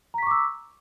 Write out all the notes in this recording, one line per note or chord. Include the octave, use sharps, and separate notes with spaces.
A#5 C#6 D6 E6 B6